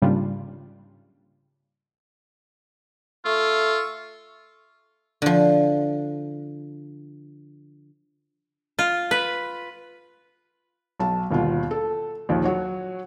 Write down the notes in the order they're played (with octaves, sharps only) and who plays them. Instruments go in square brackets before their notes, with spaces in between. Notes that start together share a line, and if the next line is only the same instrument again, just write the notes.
[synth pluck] G#2 C#3 G3 A#3 D4 F4
[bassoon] A3 [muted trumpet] F4 [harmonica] C#6 E6
[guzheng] D3 F3
[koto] F4
B4
[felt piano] B1 A5
G1 D#2 B2 F4
A4
A#1 D#2 D#3
F#3 F#4 C#5